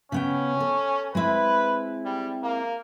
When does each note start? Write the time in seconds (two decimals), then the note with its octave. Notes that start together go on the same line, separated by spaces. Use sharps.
0.12 C#3 B3 C#4 G5
0.60 A4
1.15 G#3 C4 E4 B4
2.06 G3
2.43 A#3